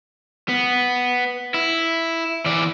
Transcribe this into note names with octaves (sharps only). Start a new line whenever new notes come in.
B3
E4
E3 D5